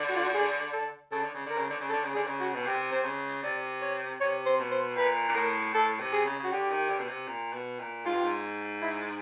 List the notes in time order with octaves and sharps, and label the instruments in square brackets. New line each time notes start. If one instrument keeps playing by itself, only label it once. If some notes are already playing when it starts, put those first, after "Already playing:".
Already playing: [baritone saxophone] D3
[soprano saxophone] F#4
F4
F#4
G#4
A4
[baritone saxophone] C#3 [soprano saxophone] A4
[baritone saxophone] D3
C#3
[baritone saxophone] D3 [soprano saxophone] A#4
[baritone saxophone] C#3
D3
C#3
[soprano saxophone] A4
[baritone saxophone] D3
C#3
[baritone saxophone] D3 [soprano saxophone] G#4
[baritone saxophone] C#3
[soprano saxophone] F#4
[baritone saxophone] B2
[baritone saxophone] C3 [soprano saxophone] G4
[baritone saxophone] C3 [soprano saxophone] C5
[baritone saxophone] C#3
[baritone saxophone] C3 [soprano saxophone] D5
[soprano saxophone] C#5
[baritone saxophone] C3 [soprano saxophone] C#5
[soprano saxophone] C5
[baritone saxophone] B2
[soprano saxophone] C5
[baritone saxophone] A#2 [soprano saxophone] B4
[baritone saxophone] A#2
[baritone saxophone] A2 [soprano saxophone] A#4
[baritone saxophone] A2 [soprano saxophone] A4
[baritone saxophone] C3
[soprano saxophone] G#4
[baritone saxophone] C#3
[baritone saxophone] C#3 [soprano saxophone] F#4
[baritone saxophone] D3 [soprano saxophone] G4
[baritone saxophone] D#3
D3
B2
C3
A#2
B2
A#2
[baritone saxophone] G#2 [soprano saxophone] F4
[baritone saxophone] G2
G#2
[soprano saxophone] E4